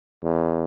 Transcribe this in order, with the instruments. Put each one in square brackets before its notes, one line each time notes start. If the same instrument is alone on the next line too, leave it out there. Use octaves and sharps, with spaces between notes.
[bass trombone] E2